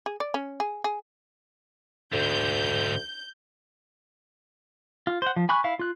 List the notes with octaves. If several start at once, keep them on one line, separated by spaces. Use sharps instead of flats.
G#4
D5
C#4
G#4
G#4
D2 G#2 D3 G6
F4
C5 F#5
F3
G#5 B5 C#6 F#6
E4 F5
F4 F#6